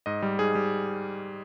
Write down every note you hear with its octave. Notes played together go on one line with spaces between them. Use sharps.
G#2 D#5
G3
G#2 G#4
G3